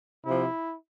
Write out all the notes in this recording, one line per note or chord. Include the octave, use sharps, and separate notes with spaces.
C3 F3 E4